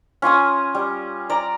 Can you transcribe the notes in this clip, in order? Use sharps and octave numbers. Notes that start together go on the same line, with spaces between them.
C#4 F4 G#5 D#6
G3
D5 A#5